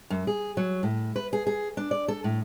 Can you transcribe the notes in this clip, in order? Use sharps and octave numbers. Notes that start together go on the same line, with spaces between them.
F#2
G#4
F#3
A2
B4
G#4
G#4
D4
D5
A4
A2